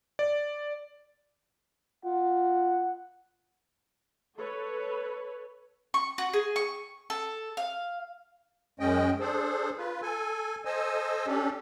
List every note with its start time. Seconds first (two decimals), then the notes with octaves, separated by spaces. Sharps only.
0.19 D5
2.05 F4 F#5
4.37 A4 B4 C#5
5.94 C#6
6.18 F#4
6.33 G#4
6.56 C#6
7.10 A4
7.57 F5
8.80 F#2 G#3 C#4 D#5 G5
9.20 D4 G#4 A4 C5
9.77 F4 B4
10.02 A4 G#5
10.65 A4 C5 D#5 G#5 E6
11.27 C#4 D4 G4 A4